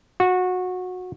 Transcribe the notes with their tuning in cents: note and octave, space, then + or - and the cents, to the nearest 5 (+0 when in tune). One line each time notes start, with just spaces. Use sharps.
F#4 -20